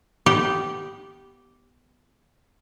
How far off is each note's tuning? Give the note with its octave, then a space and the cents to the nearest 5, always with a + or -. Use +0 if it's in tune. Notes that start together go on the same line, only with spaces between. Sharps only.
B3 +0 G4 -10 F#5 -40